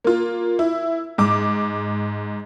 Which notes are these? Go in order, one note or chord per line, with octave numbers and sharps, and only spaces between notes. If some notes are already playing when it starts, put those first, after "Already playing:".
A#3 F4
E4
G#2 D6